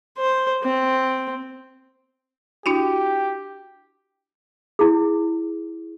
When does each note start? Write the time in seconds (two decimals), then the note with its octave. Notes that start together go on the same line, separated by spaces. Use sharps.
0.18 C5
0.63 C4
2.66 D4 E4 F#4 G4
4.79 E4 G#4